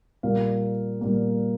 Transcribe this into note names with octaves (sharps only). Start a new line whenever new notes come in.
A#2 G3 A#3 F5
A#2 G3 A#3